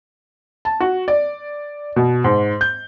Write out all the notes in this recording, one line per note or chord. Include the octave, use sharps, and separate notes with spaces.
A5
F#4
D5
B2
G#2
G6